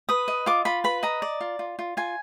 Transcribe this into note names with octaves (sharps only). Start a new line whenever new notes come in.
B4 D#6
D#5
F4 D6
F4 B5
B4 B5
D#5 A#5
D5
F4
F4
F4
F4 G#5